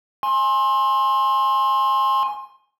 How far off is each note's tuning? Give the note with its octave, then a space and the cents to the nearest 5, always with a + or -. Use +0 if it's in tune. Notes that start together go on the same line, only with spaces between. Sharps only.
G#5 +0 C6 +25